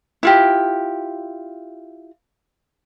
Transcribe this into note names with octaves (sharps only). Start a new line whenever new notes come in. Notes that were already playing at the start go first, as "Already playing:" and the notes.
E4 F4 G4